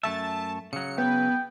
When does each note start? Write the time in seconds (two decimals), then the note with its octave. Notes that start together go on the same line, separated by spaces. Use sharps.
0.03 F#2 A3 E5 A5
0.73 C#3 F#3 C#7
0.98 B3 G5